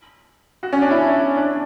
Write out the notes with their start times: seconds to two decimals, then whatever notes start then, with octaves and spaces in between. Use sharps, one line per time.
0.63 F#4
0.73 C#4
0.82 D4
0.91 E4
1.36 D4